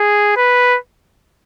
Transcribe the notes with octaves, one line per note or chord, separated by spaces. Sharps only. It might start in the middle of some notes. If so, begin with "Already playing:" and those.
Already playing: G#4
B4